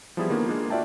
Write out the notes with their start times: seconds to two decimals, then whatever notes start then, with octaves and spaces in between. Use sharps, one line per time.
0.17 F3 G3 B3 E4 G#4
0.30 D3 D#3 F3 A#3 B3
0.46 G#3 A#3 D4 F4
0.70 F4 F#4 D5 E5 G5 A5